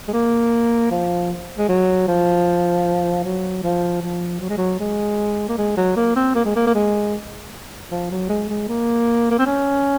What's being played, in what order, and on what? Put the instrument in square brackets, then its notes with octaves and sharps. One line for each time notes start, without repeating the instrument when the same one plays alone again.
[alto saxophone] G#3
A#3
F3
G#3
F#3
F3
F#3
F3
F3
F#3
G#3
F#3
G#3
A#3
G#3
F#3
A#3
C4
A#3
G#3
A#3
A#3
G#3
F3
F#3
G#3
G#3
A#3
A#3
C4
C#4